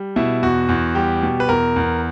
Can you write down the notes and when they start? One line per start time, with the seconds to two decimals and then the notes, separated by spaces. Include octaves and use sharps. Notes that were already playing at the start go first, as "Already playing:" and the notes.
Already playing: G3
0.16 B2 E4
0.42 E2 F#4
0.69 E2
0.95 G3 G4
1.23 B2
1.40 B4
1.48 E2 A#4
1.76 E2